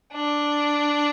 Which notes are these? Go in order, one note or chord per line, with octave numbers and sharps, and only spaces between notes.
D4